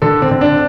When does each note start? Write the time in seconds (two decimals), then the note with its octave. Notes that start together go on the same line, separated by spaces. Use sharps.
0.02 D3 A4
0.22 C4
0.31 D3
0.41 D4